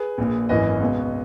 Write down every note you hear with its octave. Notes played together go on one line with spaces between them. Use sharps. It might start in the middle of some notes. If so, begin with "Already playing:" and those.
Already playing: G#4 B4
A#1 A#2
G#1 F#2 E3 B4 D#5
C#2 B2